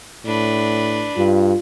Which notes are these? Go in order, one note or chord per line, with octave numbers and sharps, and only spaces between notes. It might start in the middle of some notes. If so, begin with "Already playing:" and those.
A2 D4 B4
G2 F4